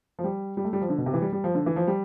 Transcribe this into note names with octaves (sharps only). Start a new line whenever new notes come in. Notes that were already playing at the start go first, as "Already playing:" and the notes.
F3
G3
G3
A3
G3
F3
D3
B2
C3
E3
G3
G3
F3
D3
E3
F3
G3